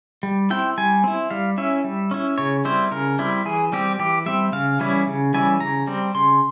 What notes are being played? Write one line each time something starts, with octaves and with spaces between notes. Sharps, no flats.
G3
C4 E4 G5
G3 G#5
C4 E4
G3 F5
C#4 E4 E5
G3
C#4 E4
C#3 C#5
G3 C4 E4 C5
C#3 A#4
G3 C4 E4
E3 G#4
G3 C4 G4
E3 G4
G3 C4 E5
C#3 F5
E3 G3 C#4 E4
C#3
E3 G3 C#4 E4 G#5
C#3 A#5
G3 C4
C#3 C6